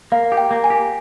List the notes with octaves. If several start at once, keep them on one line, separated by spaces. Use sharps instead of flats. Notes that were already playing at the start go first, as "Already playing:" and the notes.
A#3 F5
G4
G5
A#3
G#5
G4